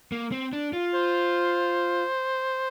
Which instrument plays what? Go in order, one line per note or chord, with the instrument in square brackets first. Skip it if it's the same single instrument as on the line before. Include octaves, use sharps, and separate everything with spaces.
[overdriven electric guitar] A#3
C4
D4
F4
[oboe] C5